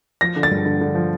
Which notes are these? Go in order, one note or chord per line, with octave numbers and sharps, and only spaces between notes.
F3 A#6
D3
A6
G2
D3
D3
F3